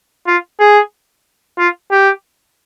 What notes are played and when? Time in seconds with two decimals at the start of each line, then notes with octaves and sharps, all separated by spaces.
0.27 F4
0.60 G#4
1.58 F4
1.91 G4